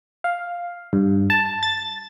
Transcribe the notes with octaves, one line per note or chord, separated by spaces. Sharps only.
F5
G2
A5
A6